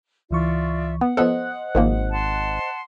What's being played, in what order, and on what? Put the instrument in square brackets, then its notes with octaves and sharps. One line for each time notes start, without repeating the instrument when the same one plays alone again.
[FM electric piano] C#2 E3 C#6 [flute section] F4 D5 E5
[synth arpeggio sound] B3 [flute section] F#5
[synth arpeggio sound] F3 B3 A4 [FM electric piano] C5 D#5 F#6
[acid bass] G#1 [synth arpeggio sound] D#3 F3 A#3
[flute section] F#5 A5 C6